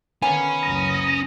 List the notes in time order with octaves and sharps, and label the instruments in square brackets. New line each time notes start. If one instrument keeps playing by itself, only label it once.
[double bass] D3 D#3 [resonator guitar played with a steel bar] A#3 B3 G#5 [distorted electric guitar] C#4
[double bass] F#1 C#2 [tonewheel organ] A#5 D#6